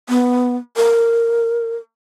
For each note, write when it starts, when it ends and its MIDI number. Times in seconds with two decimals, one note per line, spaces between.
0.09 0.56 59
0.77 1.76 70